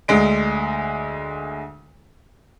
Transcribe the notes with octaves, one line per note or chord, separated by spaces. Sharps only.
D2 D3 G#3 D7